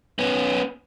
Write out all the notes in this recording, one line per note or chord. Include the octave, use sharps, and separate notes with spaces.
B3 C#4